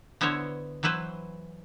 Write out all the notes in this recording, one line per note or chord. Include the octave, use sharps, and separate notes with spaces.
D3 B3 E4 C5 C#5
E3 F#3 E4 B4 C5